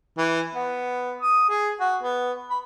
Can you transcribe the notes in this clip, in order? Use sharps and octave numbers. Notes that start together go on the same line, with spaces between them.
E3
B3
D#6
G#4
F#4
B3
B5